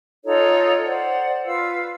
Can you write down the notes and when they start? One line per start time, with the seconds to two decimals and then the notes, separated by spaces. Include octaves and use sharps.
0.25 D#4 F4 A4 C#5
0.84 C5 D5 F#5
1.45 F4 B4 F5 E6